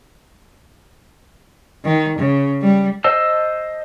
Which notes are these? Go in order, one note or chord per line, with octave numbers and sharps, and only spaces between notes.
D#3
C#3
G3
C5 D#5 A5 E6